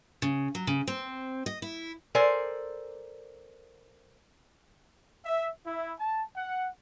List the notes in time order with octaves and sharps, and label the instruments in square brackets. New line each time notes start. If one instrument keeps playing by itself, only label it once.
[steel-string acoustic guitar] C#3
F#3
C#3
C4
D#5
E4
[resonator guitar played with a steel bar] A4 A#4 C5 D5 G#5
[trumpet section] E5
E4
A5
F#5